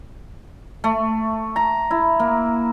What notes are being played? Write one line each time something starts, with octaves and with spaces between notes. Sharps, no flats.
A3
A#5
E4
A#3